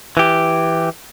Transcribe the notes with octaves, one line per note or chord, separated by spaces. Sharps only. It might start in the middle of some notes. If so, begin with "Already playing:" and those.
E3 G4